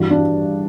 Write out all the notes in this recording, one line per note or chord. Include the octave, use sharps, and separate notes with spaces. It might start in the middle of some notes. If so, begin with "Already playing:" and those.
Already playing: G2 E3 G3 F#4
D4